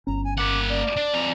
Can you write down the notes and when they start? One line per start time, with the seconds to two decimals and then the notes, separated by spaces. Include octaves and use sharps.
0.07 G1 C#4 A#5
0.24 G#5
0.38 A#3 F#5 D6
0.69 D5
0.97 D4
1.14 F2 A#5